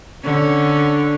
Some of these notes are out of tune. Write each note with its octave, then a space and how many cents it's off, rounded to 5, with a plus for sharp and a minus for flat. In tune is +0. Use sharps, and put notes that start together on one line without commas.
D3 +0 C#4 +0